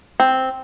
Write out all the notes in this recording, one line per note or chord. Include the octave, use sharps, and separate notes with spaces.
C4